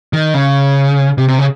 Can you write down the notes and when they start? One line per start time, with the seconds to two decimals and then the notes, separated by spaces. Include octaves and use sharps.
0.13 D#3
0.34 C#3
1.18 C3
1.28 C3
1.39 C#3